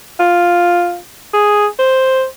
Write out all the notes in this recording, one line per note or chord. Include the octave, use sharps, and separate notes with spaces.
F4
G#4
C5